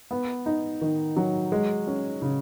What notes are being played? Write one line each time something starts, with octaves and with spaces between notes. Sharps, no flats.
B3
D#4
D#3
F#3
G#3
C#4
C#3